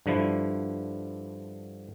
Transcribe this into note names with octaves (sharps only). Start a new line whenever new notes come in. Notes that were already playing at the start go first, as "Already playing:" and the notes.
G2 D3 F3 E4